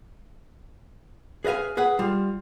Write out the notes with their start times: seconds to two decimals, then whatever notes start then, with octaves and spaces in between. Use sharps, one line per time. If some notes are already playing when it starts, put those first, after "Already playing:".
1.45 G#4 B4 D#5 F5 G#5
1.77 G#4 B4 F#5
1.99 G3 F4